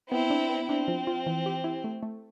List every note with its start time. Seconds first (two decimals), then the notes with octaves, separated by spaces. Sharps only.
0.11 B3 C4 E4
0.30 D4
0.50 B3
0.69 C4 D4
0.88 F3
1.07 F4
1.26 E3
1.46 G4
1.64 E4
1.84 A3
2.03 A3